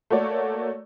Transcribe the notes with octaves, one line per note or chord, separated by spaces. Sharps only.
A3 A#3 F#4 C#5 D5